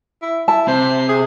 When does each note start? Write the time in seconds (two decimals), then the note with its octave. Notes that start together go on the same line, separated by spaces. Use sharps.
0.22 E4
0.48 E4 A5
0.68 C3 C5
1.09 G#4